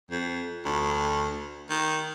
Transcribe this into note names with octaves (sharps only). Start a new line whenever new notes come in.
F2
D2
D#3